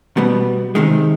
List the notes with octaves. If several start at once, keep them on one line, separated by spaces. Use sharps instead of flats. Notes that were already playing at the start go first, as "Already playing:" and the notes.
B2 G3 B3
C3 D#3 G#3